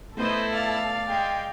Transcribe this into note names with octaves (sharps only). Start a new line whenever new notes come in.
A3 B3 E4 A4 C5 D#5 B5
D5 F5
G#3 G5